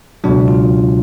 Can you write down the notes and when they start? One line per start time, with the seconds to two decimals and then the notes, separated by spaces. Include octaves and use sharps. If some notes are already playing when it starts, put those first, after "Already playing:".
0.24 C#2 B2 F#3 D4
0.48 F4